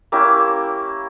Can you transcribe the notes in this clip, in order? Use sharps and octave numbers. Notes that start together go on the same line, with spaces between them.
A#3 C#4 E4 G4